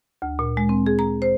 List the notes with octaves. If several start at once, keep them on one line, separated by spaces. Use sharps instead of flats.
D2
A#2
G#3
C4
G#4
A#5
C5